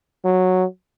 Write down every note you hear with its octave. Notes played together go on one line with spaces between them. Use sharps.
F#3